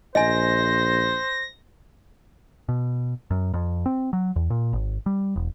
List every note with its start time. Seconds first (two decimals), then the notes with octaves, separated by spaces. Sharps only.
0.15 A#1 C5 D#5 G#5 A#6
2.69 B2
3.31 F#2
3.54 F2
3.86 C4
4.13 F#3
4.36 E2
4.50 A#2
4.73 G#1
5.06 G3
5.36 E1